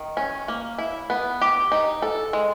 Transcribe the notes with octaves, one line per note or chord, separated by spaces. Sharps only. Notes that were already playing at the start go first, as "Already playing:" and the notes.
Already playing: D#3
C#4
A#3
E4
B3
G4
D#4
A4
G#3